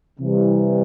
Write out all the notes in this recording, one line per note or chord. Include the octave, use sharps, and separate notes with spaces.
C3 E3 G3